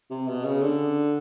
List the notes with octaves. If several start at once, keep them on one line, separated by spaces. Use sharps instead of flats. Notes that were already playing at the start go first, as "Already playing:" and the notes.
C3
B2
C#3
D3